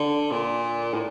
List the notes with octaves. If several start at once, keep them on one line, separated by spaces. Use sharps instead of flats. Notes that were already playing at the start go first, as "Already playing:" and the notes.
Already playing: D3
A#2
A2